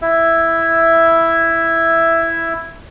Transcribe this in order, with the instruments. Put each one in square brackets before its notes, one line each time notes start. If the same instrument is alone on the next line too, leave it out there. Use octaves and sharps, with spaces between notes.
[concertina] E4 E5